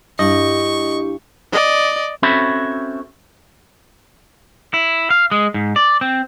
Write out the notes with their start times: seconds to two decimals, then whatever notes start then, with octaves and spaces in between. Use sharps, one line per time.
0.19 G2 D4 E4 G4 D#5 C#6
1.52 D5 D#5
2.23 C4 C#4 F#4 A4 E5 B5
4.74 E4
5.10 F5
5.31 G#3
5.54 G#2
5.76 D5
6.01 C4